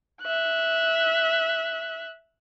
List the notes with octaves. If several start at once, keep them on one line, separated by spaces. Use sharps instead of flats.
E5 F#6